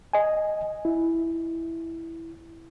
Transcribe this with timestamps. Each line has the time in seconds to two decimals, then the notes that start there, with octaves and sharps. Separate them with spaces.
0.13 D#5 G#5
0.85 E4